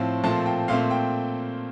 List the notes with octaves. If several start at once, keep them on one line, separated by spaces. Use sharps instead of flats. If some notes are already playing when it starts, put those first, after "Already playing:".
Already playing: A2 F3 C4
A#2 F3 A3 C4 A5
G5
A#2 A3 C4 F5
G5